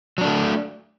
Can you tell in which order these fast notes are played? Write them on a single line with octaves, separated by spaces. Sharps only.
F#3 D4 A3